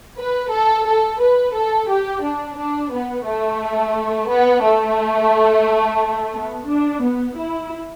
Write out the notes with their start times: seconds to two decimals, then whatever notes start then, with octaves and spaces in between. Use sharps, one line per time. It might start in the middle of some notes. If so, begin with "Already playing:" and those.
0.18 B4
0.51 A4
0.86 A4
1.20 B4
1.54 A4
1.89 G4
2.22 D4
2.57 D4
2.91 B3
3.25 A3
4.29 B3
4.63 A3
6.33 B3
6.67 D4
7.02 B3
7.36 E4